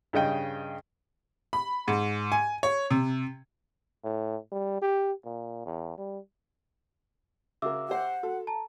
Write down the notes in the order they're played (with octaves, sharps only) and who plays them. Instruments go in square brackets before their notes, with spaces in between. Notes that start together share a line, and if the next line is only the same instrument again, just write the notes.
[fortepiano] G2 C#3 D#5 G5
[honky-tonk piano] B5
G#2
G#5
C#5
C3
[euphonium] A2
G3
G4
A#2
E2
G3
[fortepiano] C#3 F#4 A#4 [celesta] E5 D6 E6
[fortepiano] G4 C5 [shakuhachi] F#5
[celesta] F#4 [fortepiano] A4
[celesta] A5 A#5